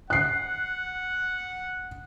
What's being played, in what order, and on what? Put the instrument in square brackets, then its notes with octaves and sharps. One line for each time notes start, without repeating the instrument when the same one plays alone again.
[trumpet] F#5 [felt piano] F#6 C7